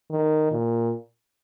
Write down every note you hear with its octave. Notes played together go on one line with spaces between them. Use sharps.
D#3
A#2